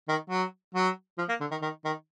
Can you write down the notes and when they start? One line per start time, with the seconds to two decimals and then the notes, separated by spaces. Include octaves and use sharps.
0.08 D#3
0.30 F#3
0.75 F#3
1.18 F3
1.29 A#3
1.40 D3
1.51 D#3
1.62 D#3
1.85 D#3